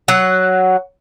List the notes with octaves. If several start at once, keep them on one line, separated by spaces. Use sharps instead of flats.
F#3 F#5